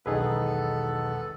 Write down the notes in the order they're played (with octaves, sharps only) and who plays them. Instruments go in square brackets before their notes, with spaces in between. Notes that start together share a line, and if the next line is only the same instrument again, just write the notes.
[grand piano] E1 B1 D#3 [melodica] B3 A4 [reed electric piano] D#4 G#4 B4